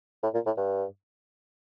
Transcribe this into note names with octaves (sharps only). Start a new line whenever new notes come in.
A2
A#2
A2
G2